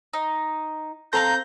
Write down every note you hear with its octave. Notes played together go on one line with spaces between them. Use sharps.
D#4
C4 A4 F5 A#5 C6 G6 A#6